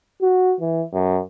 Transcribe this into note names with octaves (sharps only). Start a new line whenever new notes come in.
F#4
E3
F#2